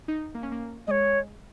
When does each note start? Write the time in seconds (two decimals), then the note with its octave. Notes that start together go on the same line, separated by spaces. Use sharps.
0.08 D#4
0.35 A#3
0.43 C#4
0.52 A#3
0.87 G#3 C#5 D#5